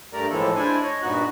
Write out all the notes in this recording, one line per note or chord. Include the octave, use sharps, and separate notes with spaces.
G2 A3 G4 A#4 D5 A#5
A2 E3 F3 G#3 A#3 A4
G#3 D4 E4 C5 D5 G#5
C#5 D#5
G2 A#2 B3 D#4 F#4 F#6